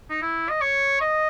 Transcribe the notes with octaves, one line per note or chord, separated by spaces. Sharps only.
D#4
E4
D#5
C#5
D#5